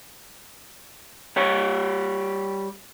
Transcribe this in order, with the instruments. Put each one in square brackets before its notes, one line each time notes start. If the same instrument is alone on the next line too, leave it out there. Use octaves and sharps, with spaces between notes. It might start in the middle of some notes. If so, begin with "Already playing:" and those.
[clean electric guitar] G3 G4 C#5